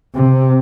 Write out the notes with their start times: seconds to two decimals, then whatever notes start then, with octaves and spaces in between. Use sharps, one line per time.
0.15 C3